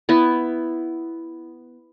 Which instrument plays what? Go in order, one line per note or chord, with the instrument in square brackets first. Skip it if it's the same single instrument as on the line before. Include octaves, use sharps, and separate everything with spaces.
[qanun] B3 E4